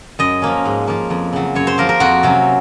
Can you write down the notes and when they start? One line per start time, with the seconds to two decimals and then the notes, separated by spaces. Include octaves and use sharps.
0.19 F#2 D#5
0.42 F3 A#3 C#4
0.66 G#2
0.87 F3 A#3
1.10 F2
1.33 C#3 F#3
1.55 F#2 C#5
1.67 C5
1.78 F3 A#3 A#4
1.89 A#4
2.00 F2 F#4
2.23 C3 F#3 C#4